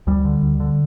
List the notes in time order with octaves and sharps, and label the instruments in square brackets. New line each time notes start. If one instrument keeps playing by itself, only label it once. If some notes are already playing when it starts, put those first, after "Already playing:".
[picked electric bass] D2 G3
D3
D2
D3